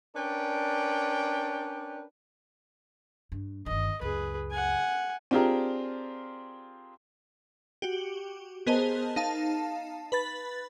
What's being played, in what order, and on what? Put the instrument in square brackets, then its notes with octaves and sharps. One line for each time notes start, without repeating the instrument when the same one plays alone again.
[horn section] C#4 D4 A#4 B4 D5 G5
[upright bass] G2
[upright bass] G1 D#3 [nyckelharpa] D#5
[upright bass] C#2 F#2 [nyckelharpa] G#4 B4
[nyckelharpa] F#5 G#5
[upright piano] C4 D4 F4 G4 G#4 A#4
[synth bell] F#4 G4
B3 G#4 A#4 C5 D#5 A5
D#4 F5 A5
B4 B5 A6